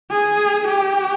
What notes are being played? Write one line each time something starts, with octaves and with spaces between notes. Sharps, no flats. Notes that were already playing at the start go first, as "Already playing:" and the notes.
G#4
G4